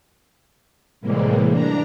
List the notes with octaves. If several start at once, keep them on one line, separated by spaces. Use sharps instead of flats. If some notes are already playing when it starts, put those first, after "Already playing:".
A2 C3 E3 G3 G#3 A#3
D4 A#5